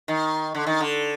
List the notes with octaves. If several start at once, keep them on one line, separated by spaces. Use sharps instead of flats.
D#3
D3
D#3
D3